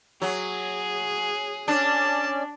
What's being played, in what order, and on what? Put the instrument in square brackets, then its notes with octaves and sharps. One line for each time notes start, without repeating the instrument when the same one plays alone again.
[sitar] F#3 [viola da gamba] G#4
[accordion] C#4 D5 [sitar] D4 [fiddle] A5